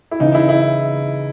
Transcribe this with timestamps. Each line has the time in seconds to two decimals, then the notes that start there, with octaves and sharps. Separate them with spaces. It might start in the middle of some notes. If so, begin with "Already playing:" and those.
0.11 E4
0.20 C#3 E3 D#4
0.35 E4
0.49 E4